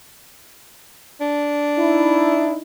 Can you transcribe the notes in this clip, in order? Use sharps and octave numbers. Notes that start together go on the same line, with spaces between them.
D4
D#4 E4